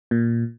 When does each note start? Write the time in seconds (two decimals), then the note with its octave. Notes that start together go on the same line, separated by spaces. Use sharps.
0.11 A#2